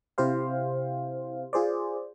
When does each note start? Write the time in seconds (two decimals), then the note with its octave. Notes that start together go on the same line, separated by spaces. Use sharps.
0.18 C3 E4 G4 C5 F5
1.53 F4 G#4 C5 D5